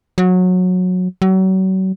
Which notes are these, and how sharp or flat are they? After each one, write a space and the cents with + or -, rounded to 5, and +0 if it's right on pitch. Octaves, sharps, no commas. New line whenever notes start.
F#3 -20
F#3 +35